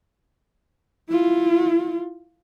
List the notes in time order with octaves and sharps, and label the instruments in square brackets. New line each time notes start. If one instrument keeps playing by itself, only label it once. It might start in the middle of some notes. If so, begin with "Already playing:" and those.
[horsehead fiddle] E4 F4